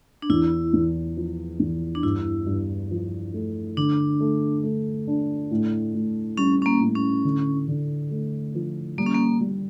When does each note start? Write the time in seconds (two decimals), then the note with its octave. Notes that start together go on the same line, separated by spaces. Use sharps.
0.22 D4
0.30 E2 E4
0.73 E2
1.17 F3
1.60 E2
1.95 D4
2.03 G2 E4
2.46 G2
2.91 F3
3.34 A3
3.77 D3 D4
4.20 A3
4.63 A3
5.07 D4
5.51 A2
5.94 A2
6.38 G3 C#4
6.62 C#4
6.66 A#3
6.80 A2
6.96 C#4
7.24 D3
7.68 D3
8.11 A3
8.55 F3
8.98 G3 A#3
9.06 C#4
9.15 A#3
9.41 G3